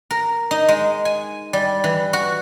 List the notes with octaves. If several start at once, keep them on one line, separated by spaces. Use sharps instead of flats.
A#4
D#4
G#3
G#5
G3
E3
F#4